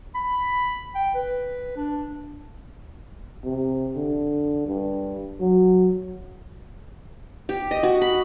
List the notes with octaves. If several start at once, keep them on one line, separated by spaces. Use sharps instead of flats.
B5
G5
B4
D4
C3
D3
G2
F#3
G4
D#5
F#4
B5